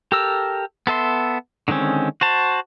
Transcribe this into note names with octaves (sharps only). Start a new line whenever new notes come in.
G4 A4 A#4 E6
B3 A4 E5 C6
D3 D#3 G#3 C4 C#4
F#4 C5 A5